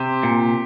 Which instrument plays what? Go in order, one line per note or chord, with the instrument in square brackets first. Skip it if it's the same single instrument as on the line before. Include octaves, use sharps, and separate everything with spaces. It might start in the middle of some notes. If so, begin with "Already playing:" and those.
Already playing: [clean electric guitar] C3 [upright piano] G4
[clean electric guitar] A#2